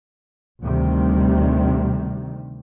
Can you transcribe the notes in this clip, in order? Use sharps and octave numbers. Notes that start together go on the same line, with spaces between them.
D2 C3 D#3 G3